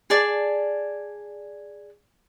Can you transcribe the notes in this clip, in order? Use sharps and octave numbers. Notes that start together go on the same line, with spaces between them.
G#4 D5 A5